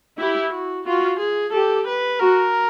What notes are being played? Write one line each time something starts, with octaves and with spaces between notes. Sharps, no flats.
E4 G4
F#4
F4 F#4
G#4
G4 A4
B4
F#4 A#4